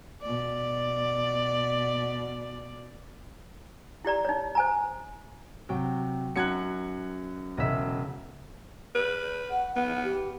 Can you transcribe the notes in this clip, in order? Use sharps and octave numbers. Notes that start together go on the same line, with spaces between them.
B2 D5
E4 G4 D5 A#5
D#4 C#5
C5 G#5 A#5
C3 F#3 G5
F#2 D#4 F#6 G#6 C#7
E1 C#3 D#5 E5
B4
F#5
B3 F#5
G4